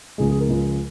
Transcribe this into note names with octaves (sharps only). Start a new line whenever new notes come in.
C#2 C#3 F3 G#3 G#4
G#4
A#4
C#2 C#3 F3 G#3